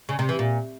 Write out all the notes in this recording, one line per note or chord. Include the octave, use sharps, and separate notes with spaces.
C#3
C3
E3
A#2